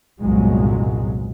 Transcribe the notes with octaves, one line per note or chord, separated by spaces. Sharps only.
G1 C2 A#2 F#3 G#3